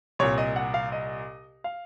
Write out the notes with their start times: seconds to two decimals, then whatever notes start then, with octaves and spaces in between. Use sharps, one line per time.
0.19 C2 A#2 C#5
0.38 D#5
0.56 F#5
0.74 F5
0.92 D#5
1.64 F5